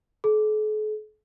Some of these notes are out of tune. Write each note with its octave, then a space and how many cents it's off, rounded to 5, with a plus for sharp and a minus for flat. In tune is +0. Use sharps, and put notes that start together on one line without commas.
A4 -45